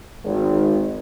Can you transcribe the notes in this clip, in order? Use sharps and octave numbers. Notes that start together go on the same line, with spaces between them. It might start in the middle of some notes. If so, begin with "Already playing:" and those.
G#1